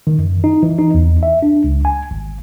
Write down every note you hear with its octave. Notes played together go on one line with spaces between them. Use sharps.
D#3
F#2
D#4
E3
D#4
E2
E5
D4
C#2
G#5
G#1